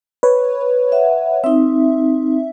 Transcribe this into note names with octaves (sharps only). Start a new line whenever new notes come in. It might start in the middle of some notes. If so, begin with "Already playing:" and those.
B4 C#5
E5 F#5
C4 D#4 E5